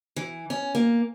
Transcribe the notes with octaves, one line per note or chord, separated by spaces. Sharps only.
E3
C#4
A#3